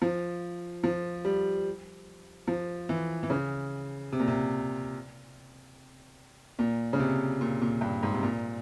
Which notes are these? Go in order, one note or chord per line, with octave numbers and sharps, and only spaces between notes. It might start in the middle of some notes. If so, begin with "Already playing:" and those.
F3
F3
G3
F3
E3
E3
C#3
C3
A#2
C3
A#2
C#3
C3
A#2
A#2
G2
G#2
C3
A#2